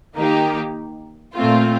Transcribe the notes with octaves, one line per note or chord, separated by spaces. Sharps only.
D#3 A#3 D#4 G4
A#2 A3 C4 F4